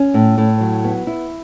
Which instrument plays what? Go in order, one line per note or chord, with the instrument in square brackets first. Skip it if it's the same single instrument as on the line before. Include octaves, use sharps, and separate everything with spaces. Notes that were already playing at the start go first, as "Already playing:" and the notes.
Already playing: [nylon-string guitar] C#4
A2
A2
F#3
B3
E4